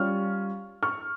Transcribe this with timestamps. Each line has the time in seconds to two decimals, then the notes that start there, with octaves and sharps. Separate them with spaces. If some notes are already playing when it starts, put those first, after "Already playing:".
Already playing: G3 C#4 F4 C#6 F6
0.83 C#6 F6